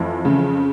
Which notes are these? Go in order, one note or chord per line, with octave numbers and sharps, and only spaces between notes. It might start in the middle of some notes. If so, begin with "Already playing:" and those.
Already playing: F2 E3
C#3